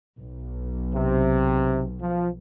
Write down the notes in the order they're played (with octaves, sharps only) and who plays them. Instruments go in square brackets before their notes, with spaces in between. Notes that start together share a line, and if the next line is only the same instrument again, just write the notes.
[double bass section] B1
[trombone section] C3
F3